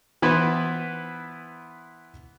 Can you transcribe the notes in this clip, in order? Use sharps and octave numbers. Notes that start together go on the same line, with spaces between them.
E3 B3 E4 B4 C5